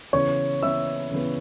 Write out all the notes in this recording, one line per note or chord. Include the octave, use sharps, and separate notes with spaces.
C#3 E3 B3 C#5 C#6
C#3 E3 B3 E5 E6
C#3 E3 B3